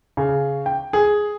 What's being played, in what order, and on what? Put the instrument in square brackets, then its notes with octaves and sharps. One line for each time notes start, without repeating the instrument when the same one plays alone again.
[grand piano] C#3
G5
G#4